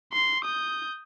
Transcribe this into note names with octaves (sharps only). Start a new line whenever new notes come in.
C6
D#6 G6